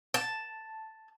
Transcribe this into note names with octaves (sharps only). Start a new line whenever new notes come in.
A5